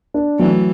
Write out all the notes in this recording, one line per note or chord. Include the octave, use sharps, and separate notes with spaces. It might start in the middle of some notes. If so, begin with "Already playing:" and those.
D4
E3 F#3 A3